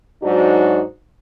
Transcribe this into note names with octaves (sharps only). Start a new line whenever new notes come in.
G#2 F#3 D4 D#4 F#4